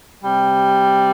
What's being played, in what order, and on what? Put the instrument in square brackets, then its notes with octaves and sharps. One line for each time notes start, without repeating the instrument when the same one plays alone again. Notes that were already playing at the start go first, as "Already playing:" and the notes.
[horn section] C3 G3